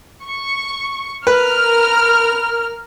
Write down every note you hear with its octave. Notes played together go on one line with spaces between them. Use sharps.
C#6
A#4 B4 F6